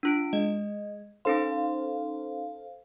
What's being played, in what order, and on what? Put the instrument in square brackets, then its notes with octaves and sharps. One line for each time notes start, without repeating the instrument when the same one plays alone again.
[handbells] D4 F4 D7
[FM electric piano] G#3 [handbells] D#5
[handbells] C#4 D#4 C6 [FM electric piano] A4 C5 F5